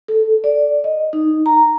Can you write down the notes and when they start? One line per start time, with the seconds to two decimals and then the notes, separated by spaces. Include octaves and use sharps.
0.08 A4
0.44 D5
0.84 D#5
1.13 D#4
1.46 A#5